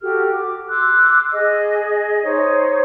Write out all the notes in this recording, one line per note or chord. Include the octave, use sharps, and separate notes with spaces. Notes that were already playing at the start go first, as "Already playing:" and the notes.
F#4 G4 A4 F6
D6
C6 D6 E6 F#6
G#4 D#5
D#4 C5 C#5